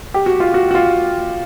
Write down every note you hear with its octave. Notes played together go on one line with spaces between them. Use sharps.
G4
F#4
F4
F#4
F#4
F4